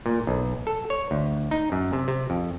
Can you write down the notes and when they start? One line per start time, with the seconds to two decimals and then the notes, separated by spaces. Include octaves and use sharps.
0.06 A#2
0.27 B1
0.67 A4
0.90 C#5
1.11 D2
1.51 D#4
1.72 F#2
1.93 C3
2.08 C3
2.30 F2